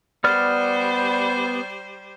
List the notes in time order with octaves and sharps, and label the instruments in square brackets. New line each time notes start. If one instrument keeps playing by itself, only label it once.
[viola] G3 C5 [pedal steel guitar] B3 D5 F6